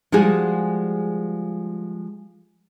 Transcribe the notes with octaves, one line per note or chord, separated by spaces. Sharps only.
F3 G3 G#3 F4 F#4 G#4